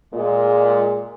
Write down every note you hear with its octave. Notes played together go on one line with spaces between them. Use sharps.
A#2 G#3